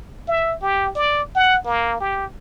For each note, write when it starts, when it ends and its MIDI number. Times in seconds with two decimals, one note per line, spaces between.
0.28 0.54 76
0.62 0.90 67
0.96 1.22 74
1.36 1.59 78
1.65 2.00 58
2.01 2.25 67